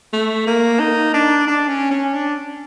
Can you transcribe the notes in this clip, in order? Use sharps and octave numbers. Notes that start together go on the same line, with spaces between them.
A3
A#3
D#4
D4
D4
C#4
C#4
D4